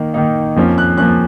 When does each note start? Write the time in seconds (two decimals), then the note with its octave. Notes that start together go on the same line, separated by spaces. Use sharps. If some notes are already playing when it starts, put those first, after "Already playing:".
Already playing: D#3 A#3 D#4
0.14 D#3 A#3 D#4
0.56 F2 F3 A#3 C#4
0.78 F#6
0.98 F3 A#3 C#4 F#6